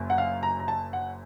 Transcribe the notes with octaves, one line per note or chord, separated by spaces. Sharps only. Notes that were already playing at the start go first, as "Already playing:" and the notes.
Already playing: F#1 F#2
F#5
F5
A#5
A#5
A5
F#5